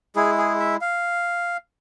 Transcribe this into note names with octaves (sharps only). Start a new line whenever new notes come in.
G#3 E4 G#4
G#4
E5
F5